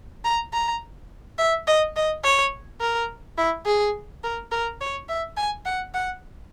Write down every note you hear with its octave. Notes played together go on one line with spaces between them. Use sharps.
A#5
A#5
E5
D#5
D#5
C#5
A#4
E4
G#4
A#4
A#4
C#5
E5
G#5
F#5
F#5